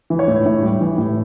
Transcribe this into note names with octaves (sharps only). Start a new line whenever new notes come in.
E3
C#5
A2
A2
G3
E3
A2